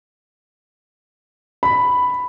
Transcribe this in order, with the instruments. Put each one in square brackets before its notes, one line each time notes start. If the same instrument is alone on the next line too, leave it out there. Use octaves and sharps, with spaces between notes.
[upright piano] B5